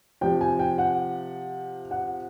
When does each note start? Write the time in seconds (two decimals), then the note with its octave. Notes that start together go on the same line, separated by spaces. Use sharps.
0.21 C3 F3 G5
0.41 G#5
0.59 G5
0.78 F#5
1.91 F#5